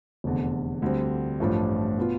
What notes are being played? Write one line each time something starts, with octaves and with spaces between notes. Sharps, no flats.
F1 E2 D3
D2 D3 G3 C4
A1 G2 F3 A3
B2 B3 F4